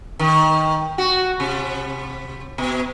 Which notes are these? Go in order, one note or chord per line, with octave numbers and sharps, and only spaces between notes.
D#3
F#4
C3
B2